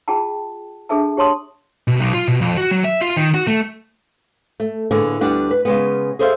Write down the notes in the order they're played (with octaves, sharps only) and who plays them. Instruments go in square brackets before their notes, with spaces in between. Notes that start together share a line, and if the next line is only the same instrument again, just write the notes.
[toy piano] F4 G#4 F#5 G5 A5
D4 G#4 A4 E5 A5
G4 C#5 A5 C6 D#6
[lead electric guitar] B2
B1
F4
B2
F2
F#4
F#3
E5
F4
D#3
F#4
A3
[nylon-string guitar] A3
A2 D3 A#3 B3 G#4
D2 G3 B3 D4 F#5
B4
C#3 G#3 B3
G#4 A4 C5 C#5 E5 F5